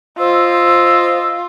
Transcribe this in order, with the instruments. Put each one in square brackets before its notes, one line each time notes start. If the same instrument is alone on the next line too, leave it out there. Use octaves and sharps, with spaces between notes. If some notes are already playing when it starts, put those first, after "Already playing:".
[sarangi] F4 [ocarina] C5 [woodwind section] D#5 E6